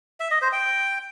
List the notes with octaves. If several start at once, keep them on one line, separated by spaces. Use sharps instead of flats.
E5
D#5
C5
G5